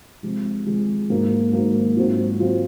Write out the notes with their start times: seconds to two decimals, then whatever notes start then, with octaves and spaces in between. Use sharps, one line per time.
0.23 C3 F3 G#3
0.66 C3 F3 G#3
1.10 G#2 F#3 A#3
1.53 G#2 F#3 A#3
1.96 G#2 F#3 C4 F4
2.40 F#3 C4 F4